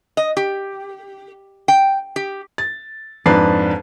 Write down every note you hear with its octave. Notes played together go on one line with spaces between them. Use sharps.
D#5
G4
G5
G4
A6
F2 G#2 D4 B4 A5 C7